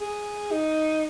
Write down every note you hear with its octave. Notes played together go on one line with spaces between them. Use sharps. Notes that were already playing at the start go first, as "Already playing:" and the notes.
G#4
D#4